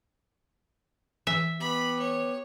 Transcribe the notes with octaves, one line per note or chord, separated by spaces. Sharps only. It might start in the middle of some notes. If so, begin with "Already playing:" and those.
E3 E5
B3 G4 B5
C#5